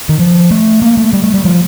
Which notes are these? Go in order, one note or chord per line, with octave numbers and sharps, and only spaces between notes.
D#3
F3
A3
A#3
A3
G3
A3
G3
F3